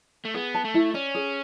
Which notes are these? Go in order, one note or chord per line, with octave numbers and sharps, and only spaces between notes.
A3
B3 G#4
A5
A3
E4
C#4 D5
G#4